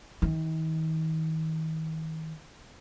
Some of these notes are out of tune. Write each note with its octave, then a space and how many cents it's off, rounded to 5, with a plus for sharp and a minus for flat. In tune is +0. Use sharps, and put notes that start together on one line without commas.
D#3 +40